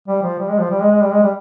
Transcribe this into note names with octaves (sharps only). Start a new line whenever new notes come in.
G3
F3
G3
G#3
F3
G3
G#3
G#3
G3
G#3
G3